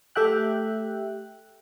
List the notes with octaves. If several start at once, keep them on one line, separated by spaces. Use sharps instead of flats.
A3 G4 E5 G5 F#6